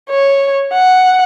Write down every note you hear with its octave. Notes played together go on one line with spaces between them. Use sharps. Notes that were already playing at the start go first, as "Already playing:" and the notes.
C#5
F#5